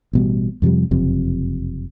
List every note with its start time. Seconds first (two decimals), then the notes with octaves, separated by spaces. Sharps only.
0.13 A1 B2 G3
0.62 F2 C3 F3 G3
0.91 F#1 F2 C3